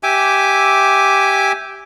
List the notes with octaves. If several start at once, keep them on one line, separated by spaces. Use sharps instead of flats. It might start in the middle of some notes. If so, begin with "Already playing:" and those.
G4 E5 G#5 D6